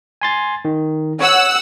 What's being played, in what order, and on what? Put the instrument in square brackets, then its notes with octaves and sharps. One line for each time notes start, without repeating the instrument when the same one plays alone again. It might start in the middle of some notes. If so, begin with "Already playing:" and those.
[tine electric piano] G#5 C6 A6
D#3
[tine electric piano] C#5 [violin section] F#5 E6